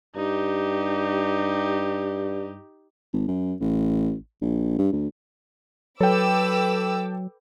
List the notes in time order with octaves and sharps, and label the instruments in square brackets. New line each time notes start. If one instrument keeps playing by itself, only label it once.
[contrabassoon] G2 [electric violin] D#4 G4
[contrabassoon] G#1
F#2
A1
A#1
G2
D2
[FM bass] F#3 [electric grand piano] A4 G5 [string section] B4 D6 E6